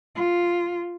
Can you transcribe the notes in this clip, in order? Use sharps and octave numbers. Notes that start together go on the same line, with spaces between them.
F4